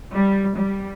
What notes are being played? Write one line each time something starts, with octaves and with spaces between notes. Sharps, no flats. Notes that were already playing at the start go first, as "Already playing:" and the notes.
G3
G3